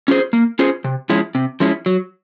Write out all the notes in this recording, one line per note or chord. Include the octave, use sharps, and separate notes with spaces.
C#4 F4 G#4 C5
A#3
C#4 F4 G#4 C5
C3
F3 G#3 C#4 E4
C3
F3 G#3 C#4 E4
F#3